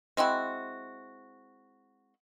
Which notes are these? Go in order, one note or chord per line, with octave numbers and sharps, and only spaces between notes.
G#3 C4 E4 F#4